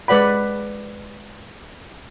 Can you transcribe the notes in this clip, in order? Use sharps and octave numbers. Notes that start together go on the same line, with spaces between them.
G#3 B4 D5 F#5 B5